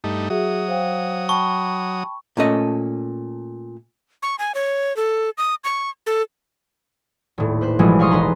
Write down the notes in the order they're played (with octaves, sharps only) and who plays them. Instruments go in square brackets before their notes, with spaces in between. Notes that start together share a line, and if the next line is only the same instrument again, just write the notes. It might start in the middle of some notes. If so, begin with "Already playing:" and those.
[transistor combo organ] G2 A3 D#4
[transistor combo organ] F#3 D#6 [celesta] F#4 G#4 E5
[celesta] C5 F5 G5
[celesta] G5 A5 B5 [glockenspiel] C#6
[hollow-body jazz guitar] A#2 A3 C#4 A4 D#5
[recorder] C#6
G#5
C#5
A4
D#6
C#6
A4
[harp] D#1 A2
B4 C5 F#6
A1 B2 E3 F3 G3 G#3
B4 C#5 F5 C6 C#6 D#6
E1 G#3 D#4 B4 A#5 C6